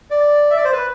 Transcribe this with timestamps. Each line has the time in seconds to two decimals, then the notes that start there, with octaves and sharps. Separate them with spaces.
0.11 D5
0.50 E5
0.57 D5
0.65 C5
0.73 B4